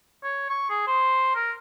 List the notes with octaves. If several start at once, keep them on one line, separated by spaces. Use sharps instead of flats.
C#5
C#6
G#4
C5
A#4